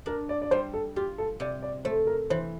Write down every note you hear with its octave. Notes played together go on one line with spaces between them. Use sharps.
D4 A#4
D5
D5
G3 C5
A4
F4 G4
A4
C3 D5
D5
A3 C5
A#4
E3 C5